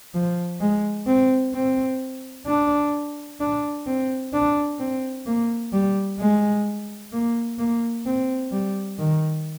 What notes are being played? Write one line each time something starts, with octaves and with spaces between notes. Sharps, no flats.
F3
G#3
C4
C4
D4
D4
C4
D4
C4
A#3
G3
G#3
A#3
A#3
C4
G3
D#3